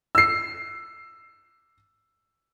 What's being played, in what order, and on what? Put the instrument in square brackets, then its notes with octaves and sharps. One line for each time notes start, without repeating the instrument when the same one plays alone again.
[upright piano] E6 C7